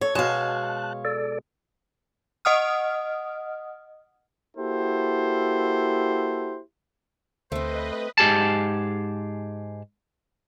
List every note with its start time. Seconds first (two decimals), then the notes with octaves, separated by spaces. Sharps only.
0.01 A4 C#5
0.15 B2 G#3 C#5 F5 A5 F#6
1.05 A4 D5
2.45 D#5 F#5 D#6 F6
4.57 A#3 E4 F#4 G4 A4 C5
7.52 D2 A3 C4 B4 C5 D#5
8.18 G#2 G4 G#4 A5